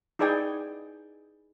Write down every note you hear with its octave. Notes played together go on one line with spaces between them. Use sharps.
D#4 E4 G#4 D5 G5 G#5